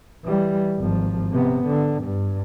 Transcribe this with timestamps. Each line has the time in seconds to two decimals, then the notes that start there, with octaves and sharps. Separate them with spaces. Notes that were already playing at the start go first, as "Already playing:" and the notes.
0.24 E3 G3
0.78 G#1 F3
1.32 C3 B3
1.67 D3
2.03 G2